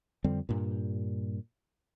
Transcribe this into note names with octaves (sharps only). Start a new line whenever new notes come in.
F2 D3 G3 C4
G2 A#2